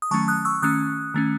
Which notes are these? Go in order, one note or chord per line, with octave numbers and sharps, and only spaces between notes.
D#6
D#3 F#3 A3 C#4 A5 C#6
D#6 F#6
C#6 E6
D#3 A3 C#4 D#6 F#6
D#3 A3 C#4